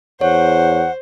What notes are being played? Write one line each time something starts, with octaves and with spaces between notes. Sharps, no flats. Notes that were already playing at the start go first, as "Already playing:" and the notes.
E2 C5 C#5 F#5